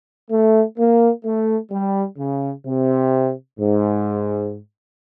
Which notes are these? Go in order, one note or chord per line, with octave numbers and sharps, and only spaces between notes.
A3
A#3
A3
G3
C#3
C3
G#2